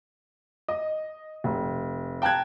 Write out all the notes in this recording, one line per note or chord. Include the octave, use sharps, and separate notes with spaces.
D#5
F1
G5 A5 A#5 F#6 G#6